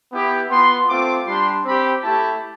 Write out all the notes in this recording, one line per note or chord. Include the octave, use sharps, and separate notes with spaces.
B3 E4 G4
B3 F4 C6
A3 C4 F4 D6
G3 D4 G4 C6
C4 G4 B5
A3 E4 G4 A5